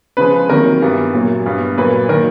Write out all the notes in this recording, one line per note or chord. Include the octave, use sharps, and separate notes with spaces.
C#3 F3 G#3 B4
C3 D#3 F#3 A#3 A#4
G2 E3 G3 B3
A#2 F#3 A#3
G2 E3 G3 B3
A#2 F#3 A#3 B4
D#3 F#3 A#3 A#4